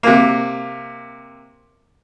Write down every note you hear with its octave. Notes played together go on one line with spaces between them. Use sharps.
C3 A#3